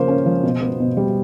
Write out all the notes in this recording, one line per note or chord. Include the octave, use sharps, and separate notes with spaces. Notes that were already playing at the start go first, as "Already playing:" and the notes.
Already playing: C#3 F3 A#3 C5
C#4
F3
B2
B3
B2
G3